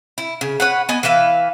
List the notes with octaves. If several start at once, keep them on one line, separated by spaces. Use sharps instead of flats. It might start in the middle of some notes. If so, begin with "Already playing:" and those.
E4
C#3
B4 C#5 F#5
B3 D#5 G#5
E3 B4 E5 F5